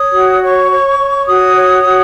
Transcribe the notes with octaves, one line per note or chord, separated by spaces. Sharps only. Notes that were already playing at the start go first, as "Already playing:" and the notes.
Already playing: C#5 D#6
F#4
C#5 C#6
C#5
C#5
F#4 D#6
C#5
F#4